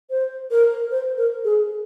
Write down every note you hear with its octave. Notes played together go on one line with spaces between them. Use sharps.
C5
A#4
C5
A#4
G#4